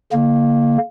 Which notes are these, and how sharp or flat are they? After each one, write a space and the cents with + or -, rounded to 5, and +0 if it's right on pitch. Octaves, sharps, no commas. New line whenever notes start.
D3 -45 A#3 +0